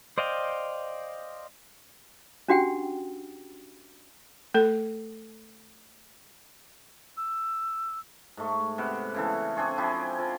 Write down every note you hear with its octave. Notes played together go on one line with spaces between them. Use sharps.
C5 D5 D#5 F5 G5
C#4 D4 F#4 G4 F#5 G5
A3 A4
E6
G#2 A3
C3 B3 F#5
C#3 E3 A4
C4 D4 G#4 C#5
F3 E4 G4 G#4
F3